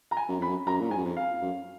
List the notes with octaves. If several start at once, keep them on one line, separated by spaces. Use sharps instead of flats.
A#5
G#5
F#2
F2 B5
F#2
F#2 A#5
A#2
G#2 G#5
F#2
F2
F5
F#2